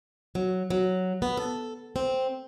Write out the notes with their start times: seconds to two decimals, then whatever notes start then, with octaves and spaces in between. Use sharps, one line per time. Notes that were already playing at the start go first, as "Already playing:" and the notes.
0.35 F#3
0.70 F#3
1.22 B3
1.37 A4
1.96 C4